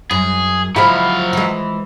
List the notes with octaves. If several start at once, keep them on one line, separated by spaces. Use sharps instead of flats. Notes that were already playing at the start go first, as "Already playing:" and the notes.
F#2 G#4
F3 F#3 G#3 E4 F5
E3 G#3